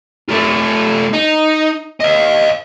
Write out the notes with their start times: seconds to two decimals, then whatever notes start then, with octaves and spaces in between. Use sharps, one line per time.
0.29 A3 F4
1.13 D#4
2.00 D#5 F5